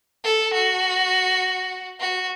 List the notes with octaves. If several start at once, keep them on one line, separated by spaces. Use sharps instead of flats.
A4
F#4
F#4